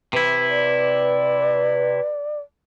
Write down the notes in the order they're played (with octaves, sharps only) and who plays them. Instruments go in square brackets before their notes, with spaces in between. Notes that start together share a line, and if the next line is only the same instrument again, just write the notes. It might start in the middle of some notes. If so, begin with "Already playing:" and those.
[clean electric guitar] C3 E4 [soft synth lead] B4
[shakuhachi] D5